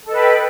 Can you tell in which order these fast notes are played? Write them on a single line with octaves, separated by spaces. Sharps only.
A4 D#5 B4 G5